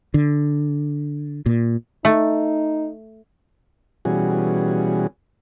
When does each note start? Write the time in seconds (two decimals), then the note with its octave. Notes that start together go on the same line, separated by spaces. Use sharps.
0.14 D3
1.46 A#2
2.05 A3 D#4
4.05 B2 E3 G3 C#4 F#4 G#4